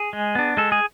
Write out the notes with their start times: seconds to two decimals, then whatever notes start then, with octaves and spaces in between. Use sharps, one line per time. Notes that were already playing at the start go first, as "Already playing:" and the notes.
Already playing: G#4
0.13 G#3
0.35 B3 D4
0.57 G#3 A4
0.72 G#4